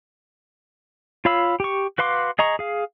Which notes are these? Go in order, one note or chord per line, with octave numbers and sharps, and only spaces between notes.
F4 C#5 F5 B5 E6
G4 C#6
F#4 B4 F5 C6 D6
G#4 D#5 A#5 C#6
G#4 F5